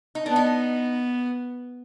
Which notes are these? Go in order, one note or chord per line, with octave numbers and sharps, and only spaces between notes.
D#4
B3 D4
D#4